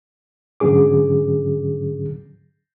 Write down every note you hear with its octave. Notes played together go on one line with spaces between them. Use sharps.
G#2 D3 F#3 C#4 G#4 D6